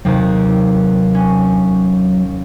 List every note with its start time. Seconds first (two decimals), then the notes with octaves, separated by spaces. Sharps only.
0.05 D#2 C3 F#3
1.15 C#4